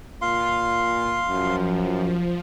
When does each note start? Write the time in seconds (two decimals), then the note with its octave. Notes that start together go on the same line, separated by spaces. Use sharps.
0.22 A#2 F5 C6
1.29 F#2 F3